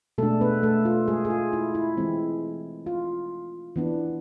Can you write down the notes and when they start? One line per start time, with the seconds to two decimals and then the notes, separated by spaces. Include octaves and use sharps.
0.18 B2 G#3 A3 D4 A4
0.41 B3 B4
0.63 A3 A4
0.85 F4
1.08 G#3 G#4
1.25 G#4
1.30 F4
1.53 E4
1.75 E4
1.97 E3 G#3 C4
2.86 F4
3.76 E3 B3 D4